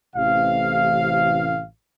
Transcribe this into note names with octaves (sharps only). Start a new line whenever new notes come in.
A1 C3 F5